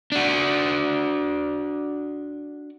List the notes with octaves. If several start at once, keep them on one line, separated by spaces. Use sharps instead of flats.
D4 F#4